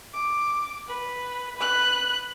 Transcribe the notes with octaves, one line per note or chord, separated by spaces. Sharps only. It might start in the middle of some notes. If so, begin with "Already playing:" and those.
D6
B4
B4 F#6